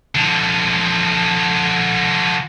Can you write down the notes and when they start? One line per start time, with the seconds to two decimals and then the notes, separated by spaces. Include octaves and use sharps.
0.15 D3 F3